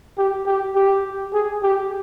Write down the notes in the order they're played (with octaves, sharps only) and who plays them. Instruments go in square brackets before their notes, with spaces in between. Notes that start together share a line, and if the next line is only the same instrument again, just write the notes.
[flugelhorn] G4
G4
G4
G#4
G4